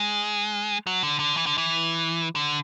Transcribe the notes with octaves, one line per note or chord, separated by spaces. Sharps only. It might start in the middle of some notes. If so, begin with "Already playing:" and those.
Already playing: G#3
F#3
D3
D3
E3
D3
E3
D3